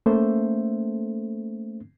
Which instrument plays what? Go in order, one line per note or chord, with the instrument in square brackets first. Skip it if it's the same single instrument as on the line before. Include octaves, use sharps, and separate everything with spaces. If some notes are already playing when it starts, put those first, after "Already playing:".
[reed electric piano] A3 A#3 C#4 A4 C5 E5